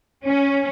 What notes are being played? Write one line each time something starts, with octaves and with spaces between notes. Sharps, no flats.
C#4